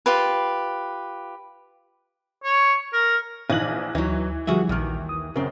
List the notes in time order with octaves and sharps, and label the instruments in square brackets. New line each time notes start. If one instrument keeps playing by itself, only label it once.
[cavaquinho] F4 G4 B4
[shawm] C#5
A#4
[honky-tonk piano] A#1 E3 F#7 [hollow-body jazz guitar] D#4 [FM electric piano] F5 F#6
[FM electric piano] D2 [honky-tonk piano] E3 [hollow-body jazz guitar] F#3 D#4
[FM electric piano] D3 F3 G3 [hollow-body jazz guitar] F#4 G#4 E5
[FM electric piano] A#1 F6 [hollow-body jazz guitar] D#2 D#3
[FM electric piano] D#6
[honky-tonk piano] F#2 [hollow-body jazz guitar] C#3 C4 [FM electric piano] A#4